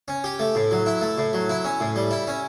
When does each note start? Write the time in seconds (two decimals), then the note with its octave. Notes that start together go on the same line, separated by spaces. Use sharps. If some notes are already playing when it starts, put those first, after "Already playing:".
0.08 C#4
0.24 G4
0.39 A3
0.55 A2
0.71 F#3
0.86 E4
1.01 A3
1.18 A2
1.33 F#3
1.49 E4
1.64 C#4
1.80 A2
1.96 G3
2.11 E4
2.27 C#4